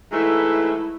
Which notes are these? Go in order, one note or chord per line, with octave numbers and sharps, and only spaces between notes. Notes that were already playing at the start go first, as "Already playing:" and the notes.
G#2 E3 A3 E4